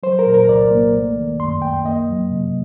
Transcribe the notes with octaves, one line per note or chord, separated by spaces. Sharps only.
F#3 C5
A#4
A#2
A#4
C2 D5
A#3
A3
D#3
F#2 C6
F#2 G5
A#3 D#5
F#3
C3